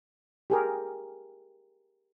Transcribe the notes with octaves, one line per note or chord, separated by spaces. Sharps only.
G4 G#4 A#4